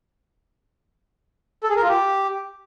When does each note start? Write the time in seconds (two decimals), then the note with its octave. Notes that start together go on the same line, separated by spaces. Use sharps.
1.64 A4
1.70 G#4
1.76 A#4
1.82 F4
1.88 G4